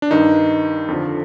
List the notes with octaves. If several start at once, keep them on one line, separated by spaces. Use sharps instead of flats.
D4
G2 D#3 D#4
F2 D3 F3